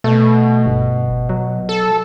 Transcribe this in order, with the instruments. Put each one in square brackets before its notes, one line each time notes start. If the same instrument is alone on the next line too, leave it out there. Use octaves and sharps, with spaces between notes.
[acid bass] B2 [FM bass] A3
[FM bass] G1
F#3
[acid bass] A4